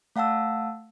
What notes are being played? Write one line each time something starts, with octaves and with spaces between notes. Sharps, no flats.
A3 F5 F#5 A5 E6